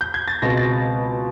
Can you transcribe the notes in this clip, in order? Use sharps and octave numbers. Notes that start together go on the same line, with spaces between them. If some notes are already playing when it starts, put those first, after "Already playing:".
G6
G#6
A6
C#2 B2 G#3 C4 A#6
A6